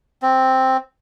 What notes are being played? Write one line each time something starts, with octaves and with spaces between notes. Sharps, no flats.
C4